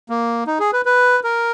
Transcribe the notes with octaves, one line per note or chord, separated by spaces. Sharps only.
A#3
D#4
G#4
B4
B4
A#4